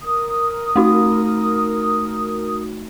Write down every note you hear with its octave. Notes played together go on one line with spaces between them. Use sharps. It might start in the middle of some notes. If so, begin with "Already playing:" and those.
A#4 D#6
A3 D#4 F#4